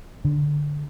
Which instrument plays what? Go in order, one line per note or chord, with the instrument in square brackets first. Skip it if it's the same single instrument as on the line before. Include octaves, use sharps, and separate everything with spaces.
[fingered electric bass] D3